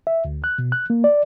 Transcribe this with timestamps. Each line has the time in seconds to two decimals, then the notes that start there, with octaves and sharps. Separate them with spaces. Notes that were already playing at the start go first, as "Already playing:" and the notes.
0.07 E5
0.25 D2
0.44 F#6
0.58 B2
0.72 F#6
0.90 A#3
1.04 D5